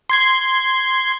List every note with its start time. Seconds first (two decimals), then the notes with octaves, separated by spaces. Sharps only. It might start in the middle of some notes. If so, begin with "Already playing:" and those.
0.10 C6 G#6 C7